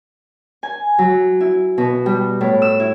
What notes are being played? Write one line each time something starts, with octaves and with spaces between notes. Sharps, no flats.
G#5
F#3
E4
B2
G3
A2
E6
E4